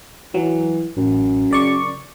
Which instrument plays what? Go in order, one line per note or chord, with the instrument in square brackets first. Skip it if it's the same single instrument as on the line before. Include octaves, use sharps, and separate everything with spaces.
[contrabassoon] E3 [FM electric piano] F#3
[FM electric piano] A1 [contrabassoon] F#2
[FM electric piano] C#3 D5 C#6